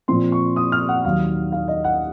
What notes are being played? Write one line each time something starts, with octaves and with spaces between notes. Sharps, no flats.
A#2 F3 C4 C6
C#6
D#6
F6
F#5
D#2 D#3 F#3 F5
F5
D#5
F#5